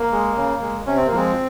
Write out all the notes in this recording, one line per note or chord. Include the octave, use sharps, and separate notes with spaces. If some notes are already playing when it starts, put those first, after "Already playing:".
Already playing: A#3
G#3
C#3
G#3
C3 C#4
C4
A#3
F3 G#3 C4